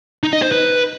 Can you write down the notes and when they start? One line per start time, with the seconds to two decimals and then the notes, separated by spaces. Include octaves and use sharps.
0.23 D#4
0.33 D#5
0.42 C5
0.52 B4